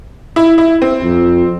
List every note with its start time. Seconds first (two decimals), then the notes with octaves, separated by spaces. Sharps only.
0.36 E4
0.58 E4
0.82 C4
1.03 F2